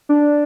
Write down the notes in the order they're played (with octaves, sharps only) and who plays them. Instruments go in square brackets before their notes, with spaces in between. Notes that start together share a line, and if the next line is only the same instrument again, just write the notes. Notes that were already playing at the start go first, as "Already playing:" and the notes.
[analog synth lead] D4